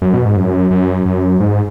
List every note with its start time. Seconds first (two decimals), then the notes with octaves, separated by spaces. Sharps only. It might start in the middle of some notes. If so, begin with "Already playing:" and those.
0.02 F#2
0.14 B2
0.25 G#2
0.37 F#2
0.71 F#2
1.05 F#2
1.40 G#2